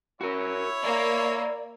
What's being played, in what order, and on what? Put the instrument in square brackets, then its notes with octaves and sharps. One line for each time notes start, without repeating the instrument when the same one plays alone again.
[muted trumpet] E4 [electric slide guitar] F#4 A#4 [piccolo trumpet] C#5
[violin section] A#3 [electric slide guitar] D5